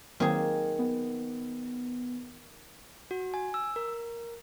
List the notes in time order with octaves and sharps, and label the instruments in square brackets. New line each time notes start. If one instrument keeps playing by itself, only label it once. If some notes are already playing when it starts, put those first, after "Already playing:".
[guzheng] D#3 G#4 [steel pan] F#3 A#3 C4
[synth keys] B3
[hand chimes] F#4
G#5
E6
A#4